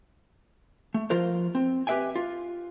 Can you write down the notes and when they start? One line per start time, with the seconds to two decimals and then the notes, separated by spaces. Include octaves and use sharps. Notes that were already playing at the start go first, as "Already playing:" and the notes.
0.94 A3
1.10 F3 F4 A#4 C5
1.55 C4
1.87 G4 B4 E5 G5 G#5
2.16 F4